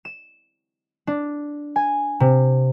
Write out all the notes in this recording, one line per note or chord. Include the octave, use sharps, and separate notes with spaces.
E7
D4
G#5
C3